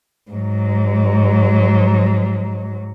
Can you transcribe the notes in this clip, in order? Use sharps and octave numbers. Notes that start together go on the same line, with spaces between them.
G#2 F#3